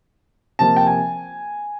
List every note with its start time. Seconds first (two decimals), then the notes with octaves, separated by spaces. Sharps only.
0.59 C3 F3 A#3 A5
0.76 G5
0.87 G#5